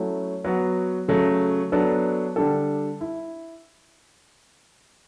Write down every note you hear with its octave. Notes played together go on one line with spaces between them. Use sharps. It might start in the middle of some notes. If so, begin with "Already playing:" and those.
Already playing: F#3 A3 C#4 E4
F#3 B3 F#4
C#3 F#3 A3
F#3 B3 D4 A4
D3 G3 D4 A4
E4